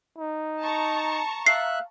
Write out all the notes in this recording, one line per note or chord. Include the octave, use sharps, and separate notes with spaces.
D#4
A5 A#5 C#6
E5 F5 F#6 C7